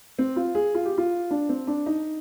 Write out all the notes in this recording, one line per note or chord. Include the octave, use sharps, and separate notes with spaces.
C4
F4
G#4
F4
G4
F4
D4
C4
D4
D#4